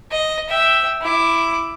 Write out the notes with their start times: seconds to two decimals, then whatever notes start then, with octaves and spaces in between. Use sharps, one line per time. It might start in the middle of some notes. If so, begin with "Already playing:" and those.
0.11 D#5
0.49 E5 G5
1.02 E4 D6